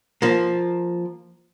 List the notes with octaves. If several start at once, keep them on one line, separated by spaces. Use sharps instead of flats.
F3 A#3